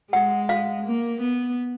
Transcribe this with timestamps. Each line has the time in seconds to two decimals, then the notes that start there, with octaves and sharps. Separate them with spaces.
0.13 G#3 F#5
0.49 F5
0.85 A#3
1.21 B3